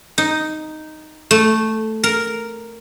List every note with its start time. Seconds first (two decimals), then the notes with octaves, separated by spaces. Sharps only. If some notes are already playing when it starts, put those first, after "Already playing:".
0.18 D#4
1.31 A3
2.04 A#4